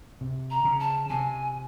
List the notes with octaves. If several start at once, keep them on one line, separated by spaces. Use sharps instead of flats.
C3
A#5
C#3
A5
C3 G#5